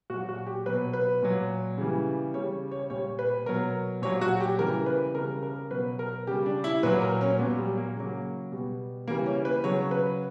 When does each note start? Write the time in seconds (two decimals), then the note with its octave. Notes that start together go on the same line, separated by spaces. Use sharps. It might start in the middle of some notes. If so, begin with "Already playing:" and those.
0.10 A#2 F#3 F#4
0.29 F#4
0.47 G4
0.66 B2 F#3 B4
0.93 B4
1.22 A#2 F#3
1.78 C#3 E3 G3
2.34 C#3 G3 C#5
2.71 C#5
2.90 A#2 G3 C#5
3.19 B4
3.46 B2 F#3 A#4
4.02 A#2 C#5
4.05 F#3
4.21 F#4
4.40 G4
4.59 C#3 E3 G3 A#4
4.86 B4
5.15 C#3 G3 A#4
5.43 A#4
5.71 B2 F#3 B4
5.99 A#4
6.27 C#3 G4
6.31 G3
6.46 D4
6.64 E4
6.83 A#2 F#3 B4
7.02 A#4
7.21 C#4
7.39 A#2 F#3 B3
7.58 G3
7.77 A#3
7.96 C#3 F#3
8.52 B2 G3
9.08 C#3 E3 G3 A#3
9.26 C#4
9.45 B4
9.64 C#3 F#3 C#5
9.91 B4